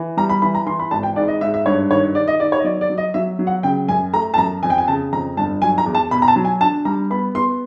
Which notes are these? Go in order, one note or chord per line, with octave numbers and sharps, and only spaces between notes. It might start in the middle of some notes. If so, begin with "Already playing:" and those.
Already playing: E3
G3 A#5
B5
E3 B5
A#5
E3 C6
B5
G#1 A5
G5
G#2 D5
D#5
G#2 E5
E5
G2 C#5
D#3 C#5
D#3 D5
D#5
D#3 D5
C#5
D#5
F#3 D5
D5
F#3
D#5
F#3 E5
F#3
F#5
C#3 G5
F#2 G#5
A3 A#5
A5
F#2 A#5
F2 G#5
G5
G#5
C#3 A5
F2 A#5
G1 A5
F#3 G#5
A#5
E2
A5
B2 B5
A#5
A5
F#3
G#5
D4 A5
G3 A#5
B3 B5
B3 C6